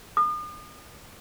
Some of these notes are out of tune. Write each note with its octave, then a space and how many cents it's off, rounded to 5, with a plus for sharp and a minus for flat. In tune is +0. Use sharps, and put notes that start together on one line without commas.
D#6 -40